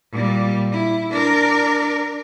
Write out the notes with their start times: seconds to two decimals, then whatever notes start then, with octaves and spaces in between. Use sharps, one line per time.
0.12 A#2 G3
0.72 E4
1.10 D4 A#4